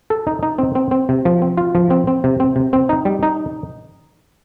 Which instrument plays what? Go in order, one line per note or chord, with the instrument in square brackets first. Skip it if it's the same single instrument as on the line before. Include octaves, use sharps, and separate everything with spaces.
[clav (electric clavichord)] A4
D#4
D#4
C4
C4
C4
C3
F3
C4
F4
F3
C4
C4
C3
C4
C3
C4
D#4
G3
D#4